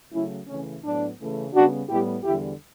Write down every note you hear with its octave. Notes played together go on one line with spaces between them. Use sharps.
C#3 F#3 A3 C#4 E4
C#3 E3 A3 C#4
A2 F#3 B3 D4
C#3 E3 A3
C#3 G3 B3 D4 F#4
A2 G3 B3 E4 G4
E2 D3 G3 E4 G4